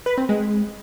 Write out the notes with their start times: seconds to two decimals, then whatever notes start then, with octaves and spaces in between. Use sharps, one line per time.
0.06 B4
0.18 C4
0.29 G#3